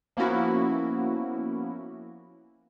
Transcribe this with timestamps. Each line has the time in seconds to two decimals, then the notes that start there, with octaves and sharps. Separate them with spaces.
0.17 F3 A#3 B3 C#4 E4 F#4